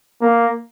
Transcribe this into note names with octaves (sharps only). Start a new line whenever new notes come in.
A#3